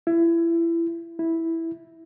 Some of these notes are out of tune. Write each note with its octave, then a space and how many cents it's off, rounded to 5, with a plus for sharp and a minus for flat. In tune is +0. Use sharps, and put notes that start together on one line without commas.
E4 +25
E4 -5